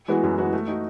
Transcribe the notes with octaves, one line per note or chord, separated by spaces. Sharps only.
E3 G#3 B3 F#4
F#2
E3 G#3 B3 F#4
A3
D#4 F#4